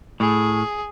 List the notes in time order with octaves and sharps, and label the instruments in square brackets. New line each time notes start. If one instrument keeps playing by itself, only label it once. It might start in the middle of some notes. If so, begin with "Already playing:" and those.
[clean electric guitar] A2 [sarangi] G#4